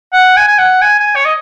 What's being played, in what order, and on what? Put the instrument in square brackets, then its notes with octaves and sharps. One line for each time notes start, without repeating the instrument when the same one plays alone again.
[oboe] F#5
G#5
G#5
F#5
G#5
G#5
C#5
D#5